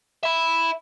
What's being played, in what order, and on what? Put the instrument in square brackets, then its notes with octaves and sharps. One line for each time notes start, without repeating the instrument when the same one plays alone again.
[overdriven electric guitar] E5 B5